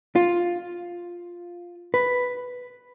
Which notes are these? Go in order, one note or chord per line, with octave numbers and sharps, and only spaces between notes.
F4
B4